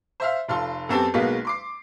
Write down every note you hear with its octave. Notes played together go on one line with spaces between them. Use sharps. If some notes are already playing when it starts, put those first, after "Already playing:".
C5 E5 F5
F1 F4 A4 C6
F#2 B3 C4 G4 A4 A5
B1 G#3 A#3 B3 F#4 B6
C6 D6 C7